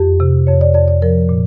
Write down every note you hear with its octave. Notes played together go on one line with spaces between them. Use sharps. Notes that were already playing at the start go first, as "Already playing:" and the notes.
Already playing: F2 G4
C3
F2 C#5
D5
F2 D5
D5
F3 A#4
A#2